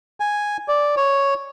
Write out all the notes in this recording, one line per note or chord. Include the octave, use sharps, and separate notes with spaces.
G#5
D5
C#5